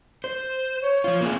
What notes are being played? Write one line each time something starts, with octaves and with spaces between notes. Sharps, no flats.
C5
C#5
F3 F4
A#3 C4 G#4